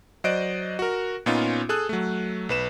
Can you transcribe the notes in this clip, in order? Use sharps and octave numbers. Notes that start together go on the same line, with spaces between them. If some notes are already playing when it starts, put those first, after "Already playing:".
F#3 C5 D5 D#5 F#6 D7
F#4 A#4
A#2 B3 C#4 D#4 F4
G#4 A4 D#6 F#6
F#3 A3
B1 B4 E7